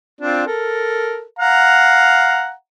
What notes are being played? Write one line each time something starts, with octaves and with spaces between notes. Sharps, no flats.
C4 D4 F4
A4 A#4
F5 F#5 A#5